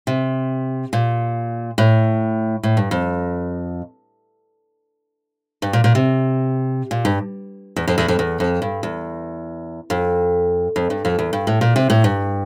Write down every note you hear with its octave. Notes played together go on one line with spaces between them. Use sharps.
C3
A#2
A2
A2
G2
F2
G2
A#2
A#2
C3
A#2
G2
E2
F2
E2
F2
E2
F2
G2
E2
F2
F2
G2
F2
E2
G2
A2
A#2
C3
A2
G2